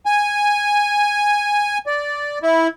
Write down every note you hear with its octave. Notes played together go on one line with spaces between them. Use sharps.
G#5
D5
E4